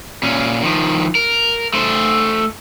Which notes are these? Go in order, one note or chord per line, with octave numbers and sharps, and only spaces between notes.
A#2 C#4
D#3 F3
A#4
A3 C5